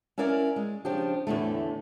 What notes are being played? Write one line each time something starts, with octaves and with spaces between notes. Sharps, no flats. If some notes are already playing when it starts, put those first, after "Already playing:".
C#4 E4 A#4 D5 F5
G#3
C#3 F3 D4 G4
E2 A2 D3 A3